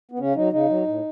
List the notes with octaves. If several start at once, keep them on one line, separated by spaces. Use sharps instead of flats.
B3
C#3 C#4
F#3 D#4
C#3 D#4
F#3
A2